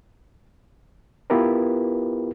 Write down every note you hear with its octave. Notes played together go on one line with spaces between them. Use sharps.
B3 E4 F4 G4 A#4 B4